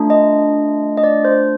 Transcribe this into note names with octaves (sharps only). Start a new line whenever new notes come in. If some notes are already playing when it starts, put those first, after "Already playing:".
Already playing: A3 D4 F4
D#5
D#5
D5
C5